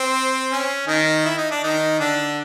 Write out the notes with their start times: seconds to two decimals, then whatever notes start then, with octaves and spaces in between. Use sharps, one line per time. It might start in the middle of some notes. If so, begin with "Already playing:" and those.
Already playing: C4
0.50 C#4
0.87 D#3 D#4
1.25 E4
1.38 D#4
1.51 D4
1.63 D#3 D#4
2.00 D3 D4